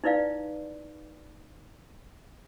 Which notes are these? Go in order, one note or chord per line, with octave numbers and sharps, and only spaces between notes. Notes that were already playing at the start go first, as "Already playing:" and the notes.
D#4 E4 B4 D5 F5